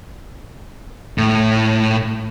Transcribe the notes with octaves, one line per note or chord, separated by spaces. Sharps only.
A2